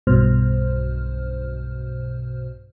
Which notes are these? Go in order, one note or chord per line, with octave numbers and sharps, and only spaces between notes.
B1 G2 B2 C5 F6